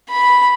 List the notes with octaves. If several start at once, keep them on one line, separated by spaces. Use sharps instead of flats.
B5